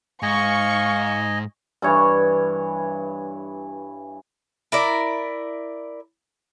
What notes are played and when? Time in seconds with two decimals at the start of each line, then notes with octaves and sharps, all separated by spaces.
0.23 G#2 D#5 F5 G#5 C#6
1.82 G2 E3 C#5
4.72 E4 A#4 D5